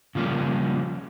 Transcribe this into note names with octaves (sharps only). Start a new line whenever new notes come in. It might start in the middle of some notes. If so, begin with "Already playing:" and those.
C#3 F3 G3 A#3 C#4